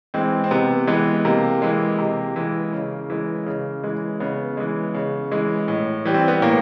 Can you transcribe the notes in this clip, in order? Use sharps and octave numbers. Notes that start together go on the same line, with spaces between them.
E3 G#3 C4
C4
C3 B3
E3 G#3 B3
C3 A#3
E3 G#3
C3
E3 G#3
C#3
E3 G#3
C#3
E3 G#3
C#3 B3
E3 G#3
C#3
E3 G#3
A2
E3 G3
C4
B3
A2 A#3